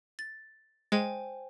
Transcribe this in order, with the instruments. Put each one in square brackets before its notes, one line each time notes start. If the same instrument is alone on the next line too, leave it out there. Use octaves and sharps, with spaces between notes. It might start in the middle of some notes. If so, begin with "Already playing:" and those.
[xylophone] A6
[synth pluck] G#3 [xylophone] C5 G5 G#5